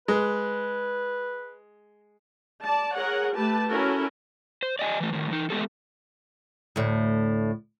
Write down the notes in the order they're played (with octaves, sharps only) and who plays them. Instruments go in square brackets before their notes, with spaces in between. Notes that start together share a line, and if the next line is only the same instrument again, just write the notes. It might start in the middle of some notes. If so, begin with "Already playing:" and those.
[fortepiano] G#3 [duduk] B4
[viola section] D5 A5
G#4 A#4 C#5 F#5
A3 G4 B4 A5
C#4 E4 F#4 A4 A#4
[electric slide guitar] C5
D5 D#5 G5 G#5
E3 A3
A2 D#3
E3 D#4
G#3 A3 B3 G4 A4
[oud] D2 A2